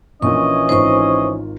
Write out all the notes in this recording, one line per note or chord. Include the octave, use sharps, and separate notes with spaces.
A#1 A#2 E3 C#4 D#5 C#6
G#1 D#3 F4 C5 C#6